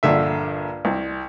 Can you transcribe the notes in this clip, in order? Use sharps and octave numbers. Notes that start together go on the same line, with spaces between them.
A#1 G2 D3 E5
C2